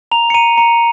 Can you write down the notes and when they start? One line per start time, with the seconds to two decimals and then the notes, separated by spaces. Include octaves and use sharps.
0.11 A#5 F7
0.30 C#7
0.34 A#5 D#7
0.57 A#5 C#7